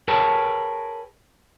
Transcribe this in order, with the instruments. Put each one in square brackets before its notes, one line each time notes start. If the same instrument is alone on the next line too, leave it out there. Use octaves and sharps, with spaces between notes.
[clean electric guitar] G#4 A#4 B4 C#5 G5 A5